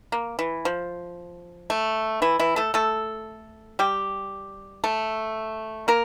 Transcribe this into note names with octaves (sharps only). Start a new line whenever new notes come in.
A#3
E3
F3
A3
E3 E4
E3 E4
A3 A4
A3 A4
G3 G4
A3 A4
A#3 A#4